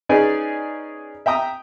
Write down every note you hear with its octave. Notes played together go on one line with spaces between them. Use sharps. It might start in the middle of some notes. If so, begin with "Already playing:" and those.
C#4 D#4 G#4 B4 D5 G#5
E5 G5 A#5 D#6